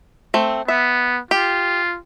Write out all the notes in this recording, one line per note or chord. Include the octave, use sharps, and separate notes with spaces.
A3 C4
B3 E5
F4 G4